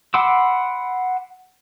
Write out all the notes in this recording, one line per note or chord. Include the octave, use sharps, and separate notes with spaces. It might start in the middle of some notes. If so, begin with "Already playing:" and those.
F#5 B5 C6 D6 E6